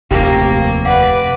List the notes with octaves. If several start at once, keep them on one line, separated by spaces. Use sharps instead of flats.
F1 D#2 A2 A#3 C4 G4
B4 D5 F5 F#5 D6